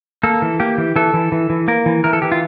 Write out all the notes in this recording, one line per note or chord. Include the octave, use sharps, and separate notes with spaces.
A#3 A4
E3
A#3 G4
E3
E3 A4
E3
E3
E3
A#3 A#4
E3
E3 A#4
A4
E3 G4
F4